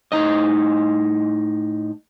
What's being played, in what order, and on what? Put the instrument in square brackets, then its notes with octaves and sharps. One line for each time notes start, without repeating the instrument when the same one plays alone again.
[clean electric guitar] A2 D#4 D#5